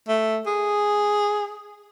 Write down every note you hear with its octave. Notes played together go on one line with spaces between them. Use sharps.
A3
G#4